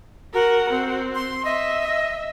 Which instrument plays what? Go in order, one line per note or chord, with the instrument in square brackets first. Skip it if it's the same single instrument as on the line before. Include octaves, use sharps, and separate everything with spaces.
[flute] F#4 [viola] A#4
[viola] C4
[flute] C6
[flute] D#5 [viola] E5